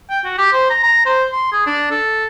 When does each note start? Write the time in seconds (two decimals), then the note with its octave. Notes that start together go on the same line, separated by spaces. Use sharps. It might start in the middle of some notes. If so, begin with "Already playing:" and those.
0.10 G5
0.25 F#4
0.38 G4
0.53 C5
0.70 A#5
0.83 A#5
1.06 C5
1.32 C6
1.52 G#4
1.67 D4
1.91 A4